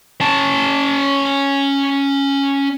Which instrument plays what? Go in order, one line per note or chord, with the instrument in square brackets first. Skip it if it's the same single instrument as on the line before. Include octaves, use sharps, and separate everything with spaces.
[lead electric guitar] C#4 A5